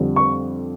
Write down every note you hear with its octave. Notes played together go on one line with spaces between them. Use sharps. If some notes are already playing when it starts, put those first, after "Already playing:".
Already playing: F2 D3 G3
C#6